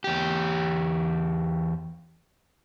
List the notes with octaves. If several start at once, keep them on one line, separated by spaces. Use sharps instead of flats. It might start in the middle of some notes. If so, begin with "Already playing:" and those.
E2 G4